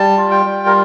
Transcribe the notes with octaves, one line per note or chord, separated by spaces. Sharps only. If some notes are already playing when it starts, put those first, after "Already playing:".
Already playing: G3 A5
F4
G5
G3
A#4